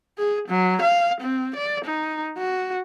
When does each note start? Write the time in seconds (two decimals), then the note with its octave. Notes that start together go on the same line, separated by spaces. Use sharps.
0.18 G#4
0.49 F#3
0.82 F5
1.21 C4
1.56 D5
1.85 D#4
2.38 F#4